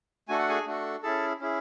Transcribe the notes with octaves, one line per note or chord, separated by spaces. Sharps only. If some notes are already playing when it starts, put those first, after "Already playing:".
A3 D4 F#4 A4 G#5
F#5
G#4 G#5
A3 D4 F#4 A4
C#4 E4 G#4 A4 A5
C#4 E4 G#4